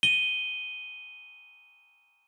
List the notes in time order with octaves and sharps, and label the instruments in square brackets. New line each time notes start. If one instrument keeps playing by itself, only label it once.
[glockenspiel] D#7 G7